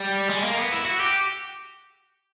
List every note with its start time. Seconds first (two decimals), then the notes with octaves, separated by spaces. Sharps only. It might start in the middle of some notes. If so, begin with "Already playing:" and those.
Already playing: G3
0.29 G#3
0.43 A#3
0.57 B3
0.72 E4
0.85 F#4
1.00 G4